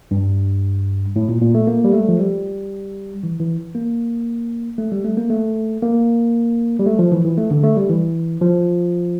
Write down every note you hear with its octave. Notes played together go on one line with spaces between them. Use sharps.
G2
A2
A#2
A#2
A3
A#3
G3
A3
F3
G3
E3
E3
A#3
A3
G3
A3
A#3
A3
A#3
G3
A3
F3
E3
E3
A3
D3
A3
G3
E3
F3